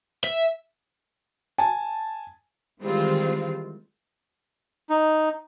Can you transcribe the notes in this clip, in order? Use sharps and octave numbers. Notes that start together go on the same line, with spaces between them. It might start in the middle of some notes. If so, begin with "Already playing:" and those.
E5
G#5 A5
D#3 E3 G3 G#3 C4 F4
D#4